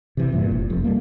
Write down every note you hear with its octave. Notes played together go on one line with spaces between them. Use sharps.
C3 E3
G2 A#2
F1
F1 F2
G3 A#3